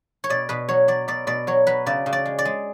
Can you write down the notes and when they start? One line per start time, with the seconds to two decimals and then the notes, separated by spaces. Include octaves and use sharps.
0.24 C#5
0.30 B2 D5
0.49 B2 B4
0.69 F#3 C#5
0.88 F#3 D5
1.08 B2 D5
1.27 B2 D5
1.47 F#3 C#5
1.67 F#3 B4
1.86 C#3 D5
2.06 C#3
2.13 D5
2.25 G#3
2.39 D5
2.45 G#3